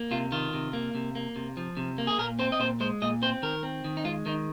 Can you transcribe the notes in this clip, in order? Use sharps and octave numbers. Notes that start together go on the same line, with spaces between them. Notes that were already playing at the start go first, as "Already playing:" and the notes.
Already playing: A#3
C3 F4
D#3 F4
C3
A#3
C3
A#3
C3
F3
C3
A#3
G#4
A#2 A#4
C4 C5
D#5
A#2 C5
G#3 C5
A#2 D#5
C4 C5
D#3 A#4
C4
D#3
D#4
G#3 F4
D#3 D#4